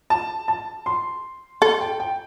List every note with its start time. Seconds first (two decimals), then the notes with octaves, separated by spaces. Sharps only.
0.10 A5
0.48 A5
0.86 C6
1.62 A4 C6
1.81 G5
2.00 G5